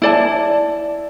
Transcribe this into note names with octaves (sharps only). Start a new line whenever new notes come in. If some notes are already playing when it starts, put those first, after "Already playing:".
E4 D5 A5